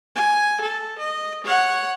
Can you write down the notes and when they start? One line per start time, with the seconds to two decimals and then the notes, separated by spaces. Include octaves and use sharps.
0.16 G#5
0.61 A4
0.99 D#5
1.44 C#5 F#5